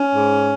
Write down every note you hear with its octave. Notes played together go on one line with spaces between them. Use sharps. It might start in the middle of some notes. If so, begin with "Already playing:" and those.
Already playing: C#4
G#2